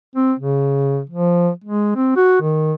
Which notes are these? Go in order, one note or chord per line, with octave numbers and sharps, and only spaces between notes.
C4
C#3
F3
G#3
C4
F#4
D#3